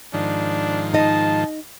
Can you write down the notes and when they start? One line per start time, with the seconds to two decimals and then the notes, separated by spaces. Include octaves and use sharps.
0.13 G#2 D#3 F3 D4
0.94 D#4 D#5 A5